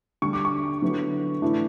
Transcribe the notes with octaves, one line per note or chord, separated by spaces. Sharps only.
D3 G3 D4 C#6
D6
C#6
D3 F#3 B3 E4
A2 E3 A3 D4